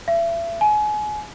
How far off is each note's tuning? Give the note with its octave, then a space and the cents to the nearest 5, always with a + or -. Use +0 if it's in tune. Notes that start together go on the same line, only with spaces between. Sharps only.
E5 +35
G#5 +30